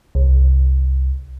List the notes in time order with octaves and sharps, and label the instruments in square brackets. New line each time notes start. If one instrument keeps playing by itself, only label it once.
[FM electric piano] C2